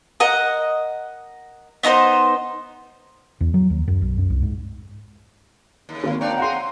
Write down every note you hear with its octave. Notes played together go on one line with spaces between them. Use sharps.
A#4 D#5 F#5
B3 D#4 B4 C5
E2
F#3
D#2
F#2
B1
F#2
C2
G#2
D#2 C#3
G#1 A#3
D4 C#5 D5 F5 G5 A#5
F#4 G#4 F#5 C6
C4